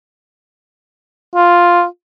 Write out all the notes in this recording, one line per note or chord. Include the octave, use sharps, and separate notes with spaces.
F4